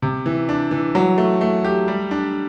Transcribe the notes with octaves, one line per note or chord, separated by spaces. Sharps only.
C3
E3
D4
E3
F#3
A3
A3
G4
G3
D4